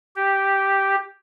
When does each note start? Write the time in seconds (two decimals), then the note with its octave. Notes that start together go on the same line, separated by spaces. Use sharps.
0.16 G4